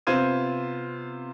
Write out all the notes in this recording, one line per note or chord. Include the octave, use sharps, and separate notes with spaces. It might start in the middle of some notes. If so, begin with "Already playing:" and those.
C3 B3 F4 C5 G#6 D#7